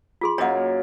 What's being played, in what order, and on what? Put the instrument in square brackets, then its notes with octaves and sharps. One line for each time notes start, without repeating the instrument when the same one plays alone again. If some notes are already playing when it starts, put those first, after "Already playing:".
[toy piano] F4 G#4 C6
[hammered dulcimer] F#2 A#3 [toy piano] C#5 D#5 F#5